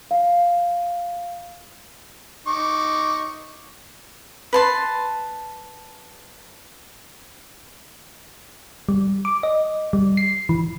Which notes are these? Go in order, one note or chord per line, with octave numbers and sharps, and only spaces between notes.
F5
D#4 C#6 D6
B4 A5 C6
G3
D6
D#5
G3
C7
E3